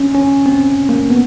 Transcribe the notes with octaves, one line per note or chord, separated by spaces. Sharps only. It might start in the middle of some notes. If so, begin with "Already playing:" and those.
Already playing: C#4
C#4
C4
A#3
B3